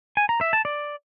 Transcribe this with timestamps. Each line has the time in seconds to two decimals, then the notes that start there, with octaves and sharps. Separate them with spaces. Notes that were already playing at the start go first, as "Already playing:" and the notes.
0.17 G#5
0.29 A#5
0.41 E5
0.53 A5
0.65 D5